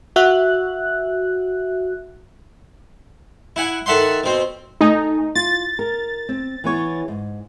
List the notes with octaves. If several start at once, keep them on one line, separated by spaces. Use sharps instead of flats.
F#4 E5 F#6
E4 F#5 G#5
D#3 A4 E5 F#5 C6
B2 C4
A3 D#4 G#5
F4 A6
A#4
C4
E3 B3 C#5
G#2